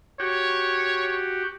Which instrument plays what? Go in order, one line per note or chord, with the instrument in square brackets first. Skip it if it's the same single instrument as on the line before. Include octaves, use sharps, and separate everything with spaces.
[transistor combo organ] F#4 G4 [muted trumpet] C#5